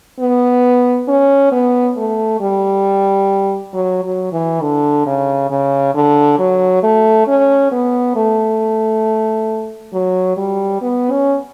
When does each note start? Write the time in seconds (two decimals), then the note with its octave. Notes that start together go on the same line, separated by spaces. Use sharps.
0.20 B3
1.08 C#4
1.52 B3
1.97 A3
2.41 G3
3.73 F#3
4.03 F#3
4.33 E3
4.62 D3
5.06 C#3
5.51 C#3
5.95 D3
6.39 F#3
6.83 A3
7.27 C#4
7.72 B3
8.16 A3
9.93 F#3
10.37 G3
10.81 B3
11.11 C#4